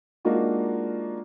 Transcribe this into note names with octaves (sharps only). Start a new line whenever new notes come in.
G#3 A#3 D4 D#4 F4 F#4